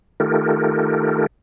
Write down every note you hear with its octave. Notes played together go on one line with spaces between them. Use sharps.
D#3 A3 F4 G4 A4 A#4